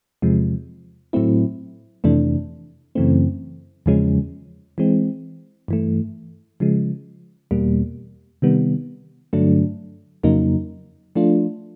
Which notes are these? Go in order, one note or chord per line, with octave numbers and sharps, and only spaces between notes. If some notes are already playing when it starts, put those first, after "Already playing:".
E2 C3 F3 G#3
A2 F#3 A3 C4 E4
F2 C3 E3 A3 D4
F#2 C#3 E3 A3 C4
E2 C#3 F3 G#3 C#4
E3 G#3 C4
G2 E3 A3
C#3 F3 G#3
E2 B2 G3 A#3
C3 D#3 G3 B3
G2 D3 F#3 A3 D4
F2 C#3 F#3 A#3 D#4
F3 A3 D4 F4